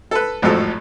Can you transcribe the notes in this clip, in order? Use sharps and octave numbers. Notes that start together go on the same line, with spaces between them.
A4 B4
G#1 F2 A2 F3 F#3 A4